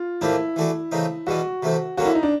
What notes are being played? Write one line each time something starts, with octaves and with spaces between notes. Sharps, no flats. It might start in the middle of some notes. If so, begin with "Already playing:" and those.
Already playing: F4
A2 F3 A#3 D4 E4 G4
E3 A3 D4 F#4
C#3 E3 A3 C4 D#4
E2 B2 G3 B3 F#4
C3 E3 A3 C4
D3 F#3 A#3 C#4 F#4
E4
D#4
D4